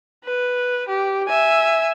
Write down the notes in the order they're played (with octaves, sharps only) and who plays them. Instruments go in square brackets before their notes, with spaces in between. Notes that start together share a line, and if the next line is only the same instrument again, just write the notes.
[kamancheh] B4
G4
E5 G#5